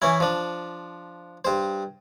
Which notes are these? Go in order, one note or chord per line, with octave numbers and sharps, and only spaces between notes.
E3 C#4 E4
F3 D4
G2 C5